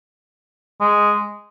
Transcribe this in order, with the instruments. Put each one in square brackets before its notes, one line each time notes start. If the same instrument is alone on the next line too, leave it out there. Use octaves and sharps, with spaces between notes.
[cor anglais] G#3